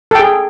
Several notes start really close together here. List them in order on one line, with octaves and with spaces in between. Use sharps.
A4 G5 G#4